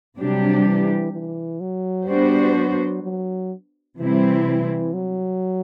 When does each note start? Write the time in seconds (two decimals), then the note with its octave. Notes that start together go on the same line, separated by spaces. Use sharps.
0.18 C3 F#3 G3 D4 G4
0.66 E3
1.12 E3
1.60 F#3
2.08 G3 B3 D4 F#4 C5
2.55 F#3
3.03 F#3
3.98 C3 E3 G3 C4 E4
4.93 F#3